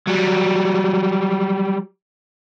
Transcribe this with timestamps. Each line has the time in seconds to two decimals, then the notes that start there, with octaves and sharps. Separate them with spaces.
0.08 F#3 G3